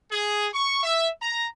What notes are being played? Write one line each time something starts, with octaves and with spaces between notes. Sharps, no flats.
G#4
C#6
E5
A#5